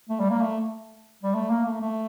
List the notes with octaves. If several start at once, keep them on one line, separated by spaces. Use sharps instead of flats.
A3
G3
A#3
A3
G3
A3
A#3
A3
A3